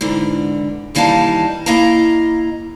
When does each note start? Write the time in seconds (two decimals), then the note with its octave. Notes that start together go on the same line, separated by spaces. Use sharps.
0.01 G#2 D3 E3
0.95 D#2 E3 G3 D#4 F5 A5
1.66 A#3 E4 D#5 F5 A#5